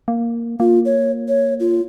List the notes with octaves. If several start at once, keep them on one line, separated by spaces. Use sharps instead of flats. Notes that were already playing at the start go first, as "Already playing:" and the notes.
A#3
A#3 F4
C#5
C#5
F4